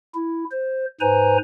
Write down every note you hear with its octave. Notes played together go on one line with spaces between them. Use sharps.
E4
C5
G#2 B4 C5 G#5 A#5